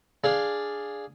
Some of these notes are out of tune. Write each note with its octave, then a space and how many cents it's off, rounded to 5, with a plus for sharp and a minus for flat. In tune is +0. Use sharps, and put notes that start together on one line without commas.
D4 +0 G#4 +0 F5 +0